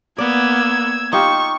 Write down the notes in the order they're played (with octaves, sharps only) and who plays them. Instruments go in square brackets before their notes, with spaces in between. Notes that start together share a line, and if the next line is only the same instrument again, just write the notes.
[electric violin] A#3 B3 [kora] D5 [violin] E6 G#6
[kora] D#4 F4 G4 [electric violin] C#6